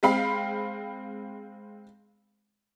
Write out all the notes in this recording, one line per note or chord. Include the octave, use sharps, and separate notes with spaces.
G#3 C4 F5 B5